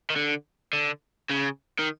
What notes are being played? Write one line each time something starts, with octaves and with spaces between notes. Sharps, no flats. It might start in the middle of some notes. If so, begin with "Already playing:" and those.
D#3
D3
D3
C#3
D#3